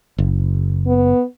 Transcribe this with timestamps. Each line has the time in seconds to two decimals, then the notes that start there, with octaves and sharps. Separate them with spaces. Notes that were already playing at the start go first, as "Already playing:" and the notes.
0.18 F#1
0.87 B3